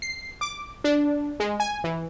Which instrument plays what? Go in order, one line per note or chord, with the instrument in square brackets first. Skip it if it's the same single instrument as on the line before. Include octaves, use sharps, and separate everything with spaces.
[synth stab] C7
D6
D4
G#3
G#5
E3